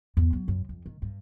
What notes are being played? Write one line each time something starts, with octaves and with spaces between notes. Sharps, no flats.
E2
F#3
F#2
F2
D#3
G2